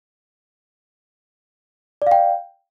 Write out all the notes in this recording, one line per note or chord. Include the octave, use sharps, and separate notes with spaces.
D5 F5 G5